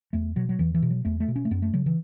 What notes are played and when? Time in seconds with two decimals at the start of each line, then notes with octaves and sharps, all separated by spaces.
0.13 E2 A3
0.36 B2 F#3
0.49 F#3
0.59 E2 E3
0.74 E3
0.82 B2
0.90 F#3
1.05 E2 A3
1.20 A3
1.28 B2
1.36 C#4
1.45 A3
1.51 F#2 B3
1.62 A3
1.74 C#3 F#3
1.86 E3